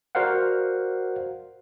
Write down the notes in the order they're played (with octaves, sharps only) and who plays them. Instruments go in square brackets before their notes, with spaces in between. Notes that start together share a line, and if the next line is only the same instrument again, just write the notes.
[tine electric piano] F#4 A#4 C5 D5 F5 F#5